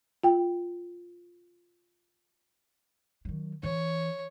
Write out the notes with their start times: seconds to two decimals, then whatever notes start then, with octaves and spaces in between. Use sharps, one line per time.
0.24 F4 G5
3.25 D#3 F#3
3.63 E3 C#5